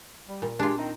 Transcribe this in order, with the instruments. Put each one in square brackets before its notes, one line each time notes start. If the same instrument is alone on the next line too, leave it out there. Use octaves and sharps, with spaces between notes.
[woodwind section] G3
[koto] A#2
[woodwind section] G#3 G4 [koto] D4 F4
[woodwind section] D#3 C4 D#4